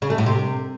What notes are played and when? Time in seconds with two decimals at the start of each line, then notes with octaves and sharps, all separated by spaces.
0.02 C#3
0.10 A3
0.18 A2
0.26 C3